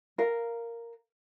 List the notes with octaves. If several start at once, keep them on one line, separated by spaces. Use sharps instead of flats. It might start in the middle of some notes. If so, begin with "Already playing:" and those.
A#4 F5